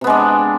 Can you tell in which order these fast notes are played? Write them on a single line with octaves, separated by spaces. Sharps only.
C3 B3 G#3 D4